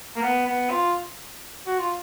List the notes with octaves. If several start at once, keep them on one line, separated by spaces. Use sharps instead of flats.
A#3
B3
B3
F4
F#4
F4